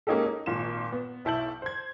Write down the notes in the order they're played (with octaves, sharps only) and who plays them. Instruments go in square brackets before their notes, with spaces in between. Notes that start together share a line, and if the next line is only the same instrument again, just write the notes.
[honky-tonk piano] G#3 A#3 C#4 D#4 G4 A4
D#4
G#1 A#2 F4 E7
B3
B1 E4 A5 G6 F#7
C5 G#6